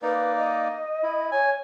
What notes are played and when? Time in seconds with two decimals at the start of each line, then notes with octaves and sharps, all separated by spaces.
0.02 A#3 D#4 B4 D5
0.37 D#5
1.03 E4
1.32 C#5 G#5